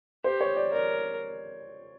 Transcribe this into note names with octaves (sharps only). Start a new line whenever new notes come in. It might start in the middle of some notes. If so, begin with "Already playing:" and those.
G4 C5
C#5
D5
A#4 D5